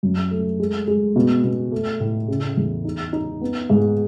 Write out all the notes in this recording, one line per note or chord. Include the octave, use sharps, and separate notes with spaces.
F#2
A3
G#3
G#3
B2
B2
A3
A2
C#3
E2
D#4
D#4
B3
G#2